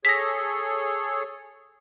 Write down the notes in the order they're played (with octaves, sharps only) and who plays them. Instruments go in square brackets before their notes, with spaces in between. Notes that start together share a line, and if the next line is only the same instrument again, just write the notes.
[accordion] G#4 A4 C#5 [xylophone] A#6 B6